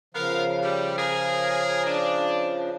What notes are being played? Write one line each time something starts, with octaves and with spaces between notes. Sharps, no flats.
C#3 F3 B3 A#4 F5
G3
G#4 A#4
D4